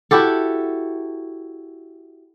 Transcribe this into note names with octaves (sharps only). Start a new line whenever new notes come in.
E4 F#4 G4 A4